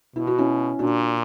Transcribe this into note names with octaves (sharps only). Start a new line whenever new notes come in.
B2 E4
F#4
C#4 E4
A#2 D4 F#4